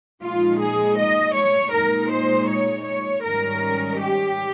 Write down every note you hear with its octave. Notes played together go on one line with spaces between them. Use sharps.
A#2 F3 G#3 D#4 F4
G#4
D#5
C#5
A#2 G#3 D#4 A#4
C5
C#5
C#5
G#2 D#3 G3 C#4 A#4
G4